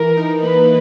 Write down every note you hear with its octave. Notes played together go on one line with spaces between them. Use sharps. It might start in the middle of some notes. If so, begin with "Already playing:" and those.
Already playing: E3 A#4
D#4
A#3 B4